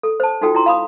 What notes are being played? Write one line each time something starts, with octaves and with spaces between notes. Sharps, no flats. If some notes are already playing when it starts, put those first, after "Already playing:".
A4
C5 A5
D#4 F4 F#4 A4 G5
E4 F4 A#5 C6
F5 B5 D#6